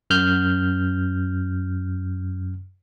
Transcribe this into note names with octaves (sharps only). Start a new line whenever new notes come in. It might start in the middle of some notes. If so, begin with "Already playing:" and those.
F#2 F6 G6